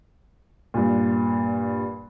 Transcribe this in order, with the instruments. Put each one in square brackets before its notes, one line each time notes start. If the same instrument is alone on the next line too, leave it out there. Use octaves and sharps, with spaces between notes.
[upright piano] G2 A#2